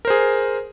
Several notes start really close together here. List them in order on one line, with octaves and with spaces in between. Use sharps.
A#4 C5 G#4